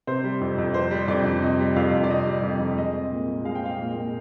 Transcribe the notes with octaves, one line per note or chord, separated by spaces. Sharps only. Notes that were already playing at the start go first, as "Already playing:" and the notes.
C3 C5
G3
F2
F2
C3 C5
G3
F2 D5
F2
C3 D#5
G3
F2 F5
F2
D5
C3 D#5
G3
F2
F2
G#3 D#5
C4
A#2
A#2
G#3 F5
G5
C4 F5
A#2
A#2